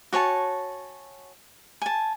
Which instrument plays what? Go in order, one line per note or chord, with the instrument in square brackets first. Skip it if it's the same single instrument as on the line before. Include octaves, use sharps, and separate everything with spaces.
[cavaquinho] F#4 C#5 G#5 A5
G#5 A5